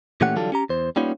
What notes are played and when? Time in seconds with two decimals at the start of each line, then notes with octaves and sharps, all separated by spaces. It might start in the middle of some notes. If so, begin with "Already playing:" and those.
0.21 A#2 E3 A3 C#4 G4 F#5
0.36 D3 E3 F#3 G3 F4 A4
0.52 C#4 G4 A#5
0.69 E2 C5
0.96 G3 A#3 B3 C#4 D#4 F4